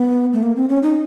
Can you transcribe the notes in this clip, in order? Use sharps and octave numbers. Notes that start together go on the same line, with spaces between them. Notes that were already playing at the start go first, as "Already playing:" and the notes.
Already playing: B3
A3
A#3
C4
C#4
D#4